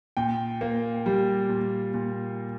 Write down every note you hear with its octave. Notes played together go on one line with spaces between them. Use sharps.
A#2 G5
A#3
G3
A#2
A#2